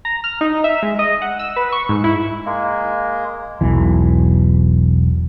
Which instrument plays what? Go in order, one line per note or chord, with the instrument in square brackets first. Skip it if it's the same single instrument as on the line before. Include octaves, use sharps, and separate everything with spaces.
[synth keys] A#5
F6
D#4
E5
G#3
D#5
F#5
E6
B4
C#6
G#2
E4
[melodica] G#3 A#3
[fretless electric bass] E1 B1 E3